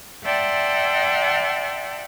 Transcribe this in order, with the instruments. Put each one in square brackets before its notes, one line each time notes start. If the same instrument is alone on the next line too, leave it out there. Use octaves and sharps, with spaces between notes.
[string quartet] D5 E5 F#5 G5 A5 C6